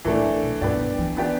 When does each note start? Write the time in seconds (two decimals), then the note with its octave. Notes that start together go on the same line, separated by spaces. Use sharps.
0.05 A2 E3 A3 D4
0.24 D3
0.43 B2
0.61 G2 B3 D4 G4 D5
0.80 G2
0.98 E3
1.17 B3 D4 G4